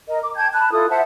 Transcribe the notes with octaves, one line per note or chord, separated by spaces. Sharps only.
A#4 D#5
D6
G5 A5 G6 G#6
A5 B5 F#6
E4 F4 A4 D#6
C5 E5 F#5 A5